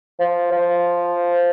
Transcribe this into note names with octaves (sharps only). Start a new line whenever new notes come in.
F3
F3